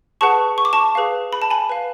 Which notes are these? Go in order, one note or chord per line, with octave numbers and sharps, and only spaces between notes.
G#4 B4 F#5 A5 C#6
C#6
D6
A5 C#6
G#4 B4 F5
B5
A5
G#5 B5
B4 F5